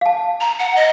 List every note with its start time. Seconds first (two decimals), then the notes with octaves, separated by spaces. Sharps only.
0.01 F5 A5
0.41 A#5
0.59 F#5
0.76 D#5